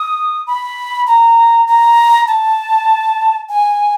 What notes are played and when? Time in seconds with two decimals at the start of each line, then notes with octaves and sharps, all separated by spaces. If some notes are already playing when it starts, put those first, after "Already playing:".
Already playing: D#6
0.47 B5
1.07 A#5
1.67 A#5
2.28 A5
3.49 G#5